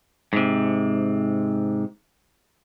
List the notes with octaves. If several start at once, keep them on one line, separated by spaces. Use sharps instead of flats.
G#2 C3